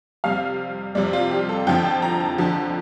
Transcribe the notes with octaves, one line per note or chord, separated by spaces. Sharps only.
F2 C3 G3 F5
F2 C3 G3 D5
F4
G4
A4
F2 D3 F3 G5
A5
A#5
A5
F2 D3 F3 A5